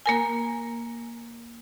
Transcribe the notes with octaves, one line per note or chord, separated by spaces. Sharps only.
A#3 A#4 G#5